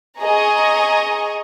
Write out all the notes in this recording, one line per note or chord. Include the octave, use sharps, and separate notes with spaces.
G#4 D#5 A#5 C#6